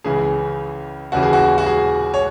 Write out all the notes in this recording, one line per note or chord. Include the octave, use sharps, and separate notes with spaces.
C#2 C#3 E3 G#4
D#2 C#3 E3 F#4
G#4
F#4
F#4
G#4
C#5